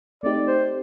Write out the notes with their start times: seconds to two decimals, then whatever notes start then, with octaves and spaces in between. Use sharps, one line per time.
0.23 A3 C4 D#4 G4 D5
0.47 C5